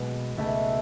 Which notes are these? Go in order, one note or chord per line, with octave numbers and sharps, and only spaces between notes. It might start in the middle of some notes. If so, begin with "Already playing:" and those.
Already playing: B2 G#3 B3
C#2 B2 A3